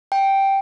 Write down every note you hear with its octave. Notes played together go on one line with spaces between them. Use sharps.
G5